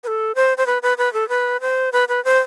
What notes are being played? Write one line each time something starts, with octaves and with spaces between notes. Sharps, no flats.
B4
A4
C5
C5
B4
B4
B4
A4
B4
C5
B4
B4
C5